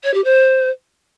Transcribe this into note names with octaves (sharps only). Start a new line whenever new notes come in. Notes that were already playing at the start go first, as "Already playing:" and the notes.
C#5
G4
C5